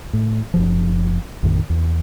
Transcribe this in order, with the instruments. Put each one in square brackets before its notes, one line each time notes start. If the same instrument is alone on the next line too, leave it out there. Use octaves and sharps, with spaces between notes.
[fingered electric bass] A2
F#1 B1 F3
A1 F2 A2 D#3
E2